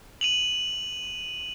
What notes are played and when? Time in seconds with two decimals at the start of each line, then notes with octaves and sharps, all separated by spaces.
0.21 D#7 F7 F#7